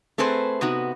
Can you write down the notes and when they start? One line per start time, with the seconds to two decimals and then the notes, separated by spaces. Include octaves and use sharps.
0.18 A3 C4 G#4 B4 C5
0.61 C3 B3 D#4 F#4